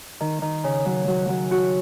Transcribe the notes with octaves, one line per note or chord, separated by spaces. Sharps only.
D#3
D#3
C#3
F#3
F#3
F#3
F#4